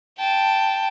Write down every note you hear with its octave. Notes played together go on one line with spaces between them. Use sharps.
G5 A5